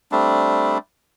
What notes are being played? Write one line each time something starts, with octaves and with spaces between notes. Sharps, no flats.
G3 A3 C4 D4